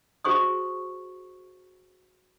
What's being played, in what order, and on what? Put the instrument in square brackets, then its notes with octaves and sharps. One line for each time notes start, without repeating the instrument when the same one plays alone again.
[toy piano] F#4 G#4 C5 C#6 D#6